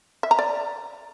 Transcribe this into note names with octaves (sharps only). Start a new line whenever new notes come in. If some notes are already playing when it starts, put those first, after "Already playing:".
E5
A#5
D5